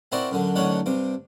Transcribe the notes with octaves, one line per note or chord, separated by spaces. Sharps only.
C4 E4 F#4 A#4 D5
F#2 D3 F#3
A1 D3 D#3 F#3 C#5 F#5
G2 C3 D6